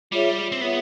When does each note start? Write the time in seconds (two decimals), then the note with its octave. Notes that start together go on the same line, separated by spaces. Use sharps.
0.12 G3 F4 G#4 C#5 E5
0.52 C4
0.61 B3 F4 G#4 C#5 E5